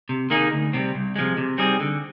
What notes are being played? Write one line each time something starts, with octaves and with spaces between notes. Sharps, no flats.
C3
D#3 A#3 D#4 G#4
D2
C3 G3 C4
C2
C3 F3 G#3
C3
G3 C4 D#4 G#4
D3